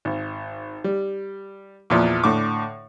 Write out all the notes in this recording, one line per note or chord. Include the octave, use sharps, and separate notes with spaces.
G#1
G3
E2 A#2 F3
A2 D3 D6